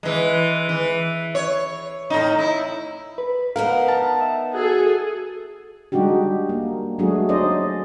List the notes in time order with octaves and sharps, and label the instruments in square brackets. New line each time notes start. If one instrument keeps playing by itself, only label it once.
[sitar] E3 G#3
E3
C#5
A2 D#4
E4
[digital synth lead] B4
[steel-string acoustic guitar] B3 D#4 A#4 [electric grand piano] F5
[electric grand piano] A5
[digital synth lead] E5
[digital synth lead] F#4 [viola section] G#4 A4
[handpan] G3 G#3 D4 D#4 F#4 G4
A#3
F#3 G#3 A3 D4 F#4 G#4
C#4 D#4 G#4 C5 D5 D#5